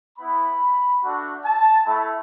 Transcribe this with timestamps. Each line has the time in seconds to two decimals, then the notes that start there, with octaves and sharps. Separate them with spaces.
0.18 B3 E4 B5
1.02 A3 D4 F#4
1.43 A5
1.85 A3 E4